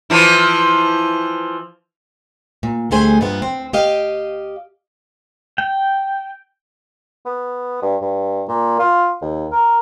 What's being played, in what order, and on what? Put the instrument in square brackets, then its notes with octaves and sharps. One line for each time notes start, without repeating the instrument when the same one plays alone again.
[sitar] E3 F3 E4
[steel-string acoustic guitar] A#2
D2 G3 A3 G#4 C5 G#5
G2 A#2 F3 B3 E5
C4
G4 D#5 F5
[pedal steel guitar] G5
[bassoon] B3
G2
G2
A#2
F4
D#2
A#4